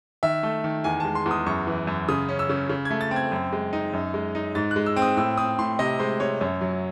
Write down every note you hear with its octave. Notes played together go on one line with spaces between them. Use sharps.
D#3 E5
A3
D#3
E2 G#5
G#3 A5
C6
E2
D#6
F#2 C#6
E3
F#2
C#3 D#6
C#4
E6
C#3
C#3
G#6
A3
A6
C4
G#6
F#2
G#3
D#4
F#2
G#3
D#4
G#2 A6
G#3 F#6
E6
C4
D#6
A2 E6
C4 D#6
A2 C6
C3 D#5
G#3 C5
C3 C#5
F#2 C#5
F#3